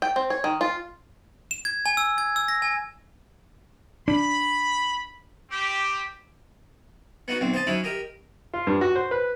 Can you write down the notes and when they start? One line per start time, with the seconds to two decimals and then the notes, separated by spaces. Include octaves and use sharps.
0.02 G5
0.16 C4
0.30 C#5
0.44 D#3
0.61 F4
1.51 E7
1.65 G#6
1.86 G#5
1.97 E6
2.18 G#6
2.36 E6
2.48 A#6
2.62 G#5
4.08 D4 B5
5.50 C4 G4
7.28 B3 D#4 F#4
7.41 B1 C4
7.54 C5 D#5 A5
7.67 F#3 C#4 D#4 E4
7.84 G4 A#4 D#5
8.54 F4
8.67 G2
8.81 F#4
8.95 C5
9.11 B4